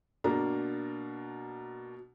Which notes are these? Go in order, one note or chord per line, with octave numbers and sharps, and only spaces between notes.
B2 A#3 D4 A#5